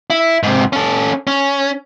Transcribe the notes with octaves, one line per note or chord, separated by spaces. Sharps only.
E4
G#2 C3
C#4 A4
C#4